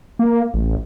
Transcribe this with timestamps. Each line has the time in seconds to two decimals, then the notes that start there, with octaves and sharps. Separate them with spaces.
0.19 A#3
0.54 A1